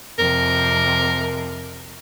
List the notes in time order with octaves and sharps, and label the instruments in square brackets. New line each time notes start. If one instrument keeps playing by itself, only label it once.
[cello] F2 C3 [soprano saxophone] A#4